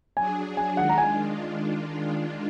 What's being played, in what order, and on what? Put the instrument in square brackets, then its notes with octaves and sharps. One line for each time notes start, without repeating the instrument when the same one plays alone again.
[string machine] F#3 D4 G#4 [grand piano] G#5
[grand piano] G#5
[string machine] D#3 G#3 D4 F4 [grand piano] F#5
[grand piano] A#5
G#5